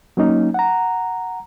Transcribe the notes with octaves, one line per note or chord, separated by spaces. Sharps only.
F#3 A#3 C#4 D#4
F#5 A#5